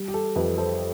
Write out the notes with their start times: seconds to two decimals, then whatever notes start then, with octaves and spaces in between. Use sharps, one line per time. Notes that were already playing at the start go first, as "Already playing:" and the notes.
Already playing: G3
0.08 G4
0.14 A4
0.36 F2 G4 B4
0.58 A4 C5